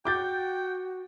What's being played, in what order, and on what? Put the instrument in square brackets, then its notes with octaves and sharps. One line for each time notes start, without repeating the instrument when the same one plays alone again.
[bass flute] F#4 [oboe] G5 [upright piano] D6 G6 A6